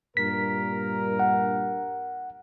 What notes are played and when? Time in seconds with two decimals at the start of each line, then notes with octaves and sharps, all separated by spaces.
0.17 G2 A#2 A#4 B6
1.19 F#5